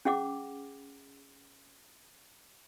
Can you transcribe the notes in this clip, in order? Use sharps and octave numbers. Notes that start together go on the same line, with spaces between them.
C#4 G#4 F#5 D6